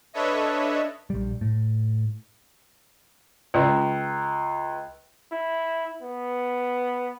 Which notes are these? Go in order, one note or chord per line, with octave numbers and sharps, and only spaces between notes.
D4 A4 B4 C#5 D#5 E5
A#1 G3
A2
C#2
E4
B3